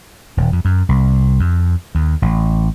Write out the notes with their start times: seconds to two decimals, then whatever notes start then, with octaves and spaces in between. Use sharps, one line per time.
0.37 D#1
0.52 F2
0.65 F#2
0.89 C2
1.40 F2
1.95 D#2
2.22 A1